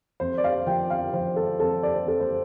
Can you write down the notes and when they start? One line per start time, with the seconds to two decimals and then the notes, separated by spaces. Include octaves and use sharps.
0.20 F2 C5
0.38 D5
0.44 F5
0.67 F3 G5
0.90 F5
1.13 F3 C5
1.36 A4
1.60 F2 A4
1.83 D5
1.95 C5
2.07 F2 A4
2.20 C5